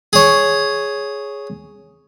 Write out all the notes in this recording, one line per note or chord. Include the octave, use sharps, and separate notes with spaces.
G#4 C#5